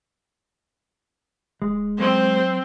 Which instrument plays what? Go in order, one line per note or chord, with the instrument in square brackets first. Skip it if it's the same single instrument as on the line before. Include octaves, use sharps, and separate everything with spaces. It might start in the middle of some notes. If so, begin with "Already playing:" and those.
[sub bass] D1 [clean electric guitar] G#3
[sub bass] F#3 [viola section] C4 [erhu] C5